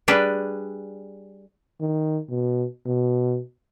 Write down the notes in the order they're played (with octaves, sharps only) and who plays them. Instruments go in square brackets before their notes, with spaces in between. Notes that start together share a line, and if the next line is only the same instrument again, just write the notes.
[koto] G3 D4 G#4 B4
[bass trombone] D#3
B2
B2